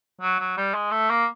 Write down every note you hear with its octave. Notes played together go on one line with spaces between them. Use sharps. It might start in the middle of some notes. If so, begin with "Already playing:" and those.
F#3
F#3
G3
G#3
A3
A#3